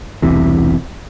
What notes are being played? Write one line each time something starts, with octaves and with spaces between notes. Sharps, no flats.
E1 C2 C3 E3